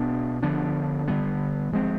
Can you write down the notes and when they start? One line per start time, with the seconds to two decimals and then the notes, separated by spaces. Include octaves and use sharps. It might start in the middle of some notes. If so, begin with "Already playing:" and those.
Already playing: B2 B3 D4
0.43 D3 F3 B3 D4
1.08 D3 G3 B3
1.72 F3 G#3 C4